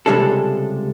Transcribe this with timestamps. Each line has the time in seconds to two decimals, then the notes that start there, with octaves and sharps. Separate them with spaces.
0.06 C#2 C3 G3 G#3 D4 A4